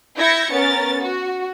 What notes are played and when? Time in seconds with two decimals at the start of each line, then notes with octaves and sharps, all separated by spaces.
0.18 E4 G6 G#6 A#6 C#7
0.53 B3 C#4 A#4 A6
1.03 F#4